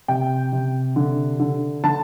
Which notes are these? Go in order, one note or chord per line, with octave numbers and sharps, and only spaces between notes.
C3 G5
C3
D3
D3
D3 A5